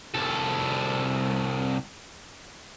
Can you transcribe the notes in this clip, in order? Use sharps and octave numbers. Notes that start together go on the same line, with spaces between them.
C2 A4